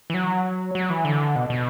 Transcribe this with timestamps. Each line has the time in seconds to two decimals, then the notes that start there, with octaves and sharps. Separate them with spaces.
0.10 E3
0.14 F#3
0.75 F#3
0.90 E3
1.05 D3
1.36 B2
1.50 B2